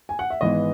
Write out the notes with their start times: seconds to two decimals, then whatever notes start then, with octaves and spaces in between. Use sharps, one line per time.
0.09 G#5
0.19 F#5
0.30 E5
0.41 G#1 G#2 E3 G#3 B3 D#5